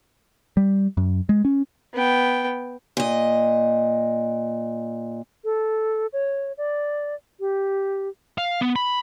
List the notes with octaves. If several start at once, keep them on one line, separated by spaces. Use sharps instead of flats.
G3
F#2
G#3
C#4
B3 G5
A#2 D#5
A4
C#5
D5
G4
F5
B3
B5